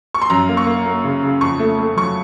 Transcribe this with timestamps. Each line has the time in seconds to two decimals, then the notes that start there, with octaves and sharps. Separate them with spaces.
0.14 C#6
0.22 C6
0.30 F#2 A#5
0.49 A#3
0.57 C#6
0.66 A#3
0.86 A#3
1.04 C#3
1.23 C#3
1.41 F2 C#6
1.59 A3
1.79 A3
1.97 F#3 C#6